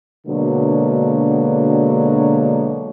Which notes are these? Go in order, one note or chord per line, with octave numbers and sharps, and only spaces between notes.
B2 D3 F#3 G#3 A#3 D4